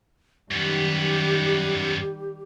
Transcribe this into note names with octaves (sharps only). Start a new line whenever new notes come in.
F#2 D#3 G3 B3 G4